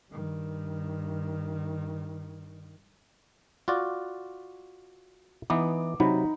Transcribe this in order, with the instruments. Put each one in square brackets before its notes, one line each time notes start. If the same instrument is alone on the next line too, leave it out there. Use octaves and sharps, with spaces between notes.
[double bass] G2 D#3
[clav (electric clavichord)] F4 F#4 D5
[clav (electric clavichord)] E3 B3 D#4 [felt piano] D6
[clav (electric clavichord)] C3 F#3 [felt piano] D#4 B5